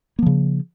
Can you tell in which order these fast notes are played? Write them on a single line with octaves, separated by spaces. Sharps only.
A#3 F3 C#3